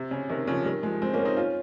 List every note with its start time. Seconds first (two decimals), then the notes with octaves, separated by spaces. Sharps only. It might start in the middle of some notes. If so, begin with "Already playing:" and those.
Already playing: C3
0.11 C#3
0.29 C3 D#3
0.47 C#3 F3
0.65 D#3 G3
0.83 F3 G#3
1.02 G#3 C4
1.13 A#3 C#4
1.25 C4 D#4
1.37 C#4 F4